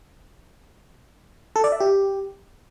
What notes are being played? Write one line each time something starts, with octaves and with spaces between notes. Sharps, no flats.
A4
D5
E5
G4